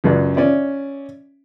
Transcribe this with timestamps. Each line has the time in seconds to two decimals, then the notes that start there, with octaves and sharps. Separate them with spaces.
0.04 C#2 F#2 D5
0.36 C#4 D5 E5